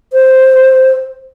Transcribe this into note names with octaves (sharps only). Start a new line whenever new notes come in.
C5